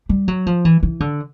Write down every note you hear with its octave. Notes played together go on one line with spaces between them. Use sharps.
G3
F#3
F3
E3
E3
D3